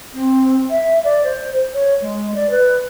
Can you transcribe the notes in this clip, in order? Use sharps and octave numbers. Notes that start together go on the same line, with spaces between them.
C4
E5
D5
C5
C#5
G#3
D5
B4